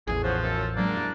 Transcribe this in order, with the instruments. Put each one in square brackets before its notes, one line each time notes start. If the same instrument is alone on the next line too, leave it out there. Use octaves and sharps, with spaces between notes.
[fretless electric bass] A1 E2 [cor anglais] G#4
[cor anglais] F3 [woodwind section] C5 C#5 F#5
[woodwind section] F#2 A4
[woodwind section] D3 D4 [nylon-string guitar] F#3 G#3 [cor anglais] A#3
[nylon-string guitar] E4 F#4 G#4